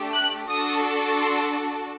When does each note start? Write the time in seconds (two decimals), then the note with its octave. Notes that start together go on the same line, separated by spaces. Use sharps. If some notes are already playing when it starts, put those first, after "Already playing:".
Already playing: A3 D4 G4
0.14 F#6
0.49 D4 F#4 A4 D#6
1.20 C6